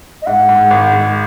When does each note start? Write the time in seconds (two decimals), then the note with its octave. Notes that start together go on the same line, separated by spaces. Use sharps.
0.22 D#5
0.26 G#2 F#5
0.49 G#2
0.71 G#1
0.93 G#2